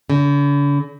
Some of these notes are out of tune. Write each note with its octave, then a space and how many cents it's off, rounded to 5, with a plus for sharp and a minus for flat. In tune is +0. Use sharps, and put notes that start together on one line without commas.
D3 -45